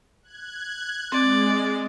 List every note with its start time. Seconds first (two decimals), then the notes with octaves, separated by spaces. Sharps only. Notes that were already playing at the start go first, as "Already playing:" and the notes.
0.23 F#6 G#6
1.12 G#3 C4 D5